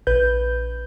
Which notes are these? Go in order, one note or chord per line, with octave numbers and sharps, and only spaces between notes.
A#1 B4 G6